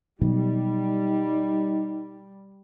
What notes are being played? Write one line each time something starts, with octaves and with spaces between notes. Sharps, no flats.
B2 D#3 F#3 G3 D#4